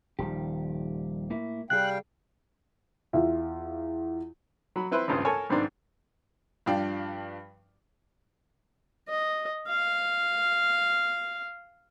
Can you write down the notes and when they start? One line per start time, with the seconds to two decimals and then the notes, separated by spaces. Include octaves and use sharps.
0.19 D#1 D#3 F3 G3 G4
1.30 A2 A#3 E4
1.70 C2 G3 G#4 F5 G5 F#6
3.13 E2 F4 E5
4.76 F#3 B5
4.91 C4 E4 B4 C5
5.08 G#1 C#2 G2 C5 D#6
5.25 A4 A#4 C#5 G#5 A5
5.49 B1 G#2 D#3 C4 D4
6.66 G2 F3 D4 F5 G5
9.08 D#5
9.68 F5